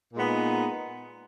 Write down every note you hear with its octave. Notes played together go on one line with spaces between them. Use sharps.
A#2 G#3 B3 D#4